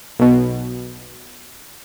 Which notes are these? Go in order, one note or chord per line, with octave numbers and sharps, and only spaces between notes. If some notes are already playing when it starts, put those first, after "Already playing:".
B1 B2